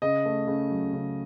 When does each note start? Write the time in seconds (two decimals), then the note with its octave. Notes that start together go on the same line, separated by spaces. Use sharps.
0.02 C#3 D#5
0.25 A3
0.47 C#3
0.70 F#3
0.93 C#3